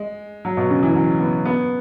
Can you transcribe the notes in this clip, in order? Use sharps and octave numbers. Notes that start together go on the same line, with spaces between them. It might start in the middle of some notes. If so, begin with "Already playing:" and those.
Already playing: G#3
F#3
B2
C#3
E3
F#3
B3
B3